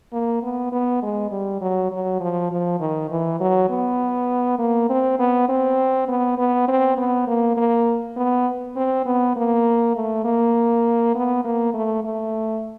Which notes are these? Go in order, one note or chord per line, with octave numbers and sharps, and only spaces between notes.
A#3
B3
B3
G#3
G3
F#3
F#3
F3
F3
D#3
E3
F#3
B3
A#3
C4
B3
C4
B3
B3
C4
B3
A#3
A#3
B3
C4
B3
A#3
A3
A#3
B3
A#3
A3
A3